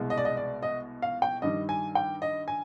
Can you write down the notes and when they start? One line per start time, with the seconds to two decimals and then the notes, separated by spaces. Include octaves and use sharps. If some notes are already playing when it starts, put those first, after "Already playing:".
Already playing: C2 B2 G#3
0.10 D#5
0.17 D5
0.25 D#5
0.37 D5
0.63 D#5
1.02 F5
1.22 G5
1.42 G2 D#3 G3 D#5
1.69 G#5
1.95 G5
2.22 D#5
2.48 G#5